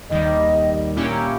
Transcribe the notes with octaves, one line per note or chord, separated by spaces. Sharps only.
D#2 D#3 G3 D#5
A#2 A#3 C#4 E4 G4